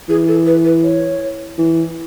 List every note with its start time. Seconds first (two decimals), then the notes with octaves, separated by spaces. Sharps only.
0.09 E3 G#4
0.28 A4
0.46 B4
0.65 B4
0.83 C#5
1.58 E3